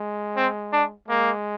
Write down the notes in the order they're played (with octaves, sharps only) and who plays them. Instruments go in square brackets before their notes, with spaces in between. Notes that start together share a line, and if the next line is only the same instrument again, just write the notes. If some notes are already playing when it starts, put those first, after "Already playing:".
Already playing: [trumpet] G#3
[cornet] C4
D4
[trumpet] G#3 [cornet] A#3